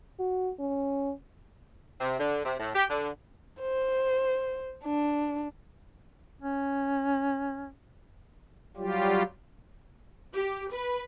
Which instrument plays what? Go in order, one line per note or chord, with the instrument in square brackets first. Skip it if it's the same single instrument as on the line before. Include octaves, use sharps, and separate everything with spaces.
[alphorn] F#4
C#4
[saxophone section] C3
D3
C3
A2
G4
D3
[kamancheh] C5
D4
[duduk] C#4
[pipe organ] F#3 G3 F4 G4
[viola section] G4
B4